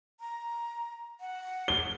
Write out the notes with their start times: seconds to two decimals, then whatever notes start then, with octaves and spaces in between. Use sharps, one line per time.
0.20 A#5
1.20 F#5
1.68 G7